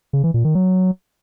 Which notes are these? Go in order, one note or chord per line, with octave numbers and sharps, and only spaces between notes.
C#3
E3
A#2
D#3
F#3